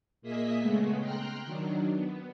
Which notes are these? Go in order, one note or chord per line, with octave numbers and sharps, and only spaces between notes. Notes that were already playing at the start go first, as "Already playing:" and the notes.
A#2 A#3 G#4 D#5 E5 B6
C#3 G#3 A3 B3
G5 A#5 C6 F6 F#6
D#3 F#3 D4
B3